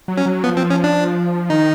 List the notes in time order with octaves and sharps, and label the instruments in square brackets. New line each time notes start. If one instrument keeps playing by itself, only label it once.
[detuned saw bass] F#3
[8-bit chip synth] C#4
[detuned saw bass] F#3
[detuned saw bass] F3 [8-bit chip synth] B3
[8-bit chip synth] C4
C#4
D4
[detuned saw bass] D#3 [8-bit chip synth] D#4